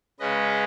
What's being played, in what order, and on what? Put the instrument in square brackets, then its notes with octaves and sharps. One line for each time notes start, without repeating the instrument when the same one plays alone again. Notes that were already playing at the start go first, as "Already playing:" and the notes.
[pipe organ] C#3 G#3 C#4 B4 D#5